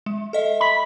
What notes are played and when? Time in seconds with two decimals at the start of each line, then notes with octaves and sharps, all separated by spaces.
0.06 G#3
0.33 A4 D#5 E5
0.60 B5